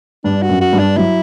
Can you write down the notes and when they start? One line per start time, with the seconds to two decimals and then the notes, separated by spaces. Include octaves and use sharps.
0.24 G2 D4
0.42 F#4
0.49 F#2
0.61 F#4
0.73 G2
0.79 D4
0.97 F#3 E4